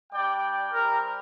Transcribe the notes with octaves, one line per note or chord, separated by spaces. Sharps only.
G3 D4 G4 D5 G5
G3 C4 G4 A#4